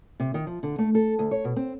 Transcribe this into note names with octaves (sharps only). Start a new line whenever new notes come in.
C3
D#3
F3
D3
A3
A4
D2
C#5
B2
C4